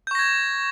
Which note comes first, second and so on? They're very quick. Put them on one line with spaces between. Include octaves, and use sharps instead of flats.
G6 C#6 A#6 G#6